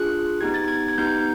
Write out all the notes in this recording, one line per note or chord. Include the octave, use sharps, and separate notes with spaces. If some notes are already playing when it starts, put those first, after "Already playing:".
Already playing: D4 F4 G#4 F#6
B3 D#4 G4 G#6
A6
G#6
G#6
B3 D#4 G4 G6